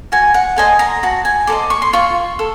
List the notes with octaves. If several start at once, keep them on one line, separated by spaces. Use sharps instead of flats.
F#4 G#5
F#5
A4 C5 D#5 G#5
A#5
F#4 A5
G#5
A4 C5 D#5 D6
C#6
C6
F4 C#6
A4